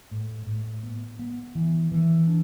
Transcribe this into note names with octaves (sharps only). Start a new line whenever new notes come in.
A2
A2
B3
B3
E3
E3
D4